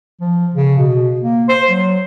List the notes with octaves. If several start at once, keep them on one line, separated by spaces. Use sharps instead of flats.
F3
C#3
B2
A#3
C5
F#3